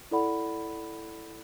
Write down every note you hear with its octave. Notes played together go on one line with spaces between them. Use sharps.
E4 A4 D5 F#5 B5